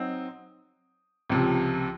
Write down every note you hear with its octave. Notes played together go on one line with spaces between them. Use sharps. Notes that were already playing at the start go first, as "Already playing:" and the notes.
Already playing: F#3 C4 D#4
C#2 C3 F3